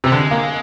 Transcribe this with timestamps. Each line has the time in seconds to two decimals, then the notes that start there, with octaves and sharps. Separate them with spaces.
0.04 C3 G3
0.12 D3 G#3
0.31 A#3